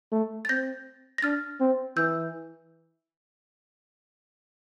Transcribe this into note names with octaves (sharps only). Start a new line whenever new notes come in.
A3
A6
C4 G6 A#6
A#6
D4 F6 A6
C4
E3 E6 G6